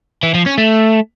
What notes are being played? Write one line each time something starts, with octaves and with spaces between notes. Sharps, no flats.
E3
F3
C#4
A3